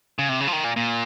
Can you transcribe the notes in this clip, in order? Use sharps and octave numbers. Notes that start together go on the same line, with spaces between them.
C#3
C3
C#3
F3
D#3
A#2
A#2